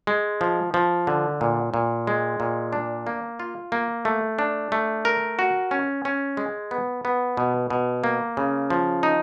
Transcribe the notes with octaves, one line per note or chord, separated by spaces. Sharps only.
G#3
F3
F3
D3
A#2
A#2
G#3
A#2
D4
A#3
F4
A#3
A3
D4
A3
A#4
F#4
C#4
C#4
G#3
B3
B3
B2
B2
A#3
C#3
F3
D#4